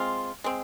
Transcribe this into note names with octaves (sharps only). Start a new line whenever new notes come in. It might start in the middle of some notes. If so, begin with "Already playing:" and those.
Already playing: G#3 C4 F4
G#3 C4